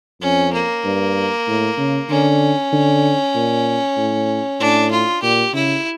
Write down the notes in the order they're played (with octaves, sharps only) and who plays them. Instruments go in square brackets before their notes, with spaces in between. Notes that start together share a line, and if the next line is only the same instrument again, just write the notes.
[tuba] F2 [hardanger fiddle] C#4
[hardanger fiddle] A#3
[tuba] G2
A2
C#3
[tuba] D3 [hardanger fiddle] C#4
[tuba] D3
A#2
A2
[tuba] A2 [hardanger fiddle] D4
[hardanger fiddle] F4
[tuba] A#2 [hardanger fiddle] G4
[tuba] C#3 [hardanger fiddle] E4